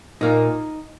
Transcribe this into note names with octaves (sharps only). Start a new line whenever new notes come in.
A#2 A#3 D#4